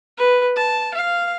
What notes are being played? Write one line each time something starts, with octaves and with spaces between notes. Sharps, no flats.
B4
A5
F5